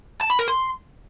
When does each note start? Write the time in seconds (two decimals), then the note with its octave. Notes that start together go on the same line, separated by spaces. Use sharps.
0.21 A5
0.30 B5
0.39 A#4
0.48 C6